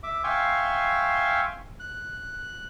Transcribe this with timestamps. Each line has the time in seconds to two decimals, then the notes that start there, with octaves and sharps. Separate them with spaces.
0.03 E5 D6
0.24 E5 F5 G5 G#5 C6 C#6
1.80 F#6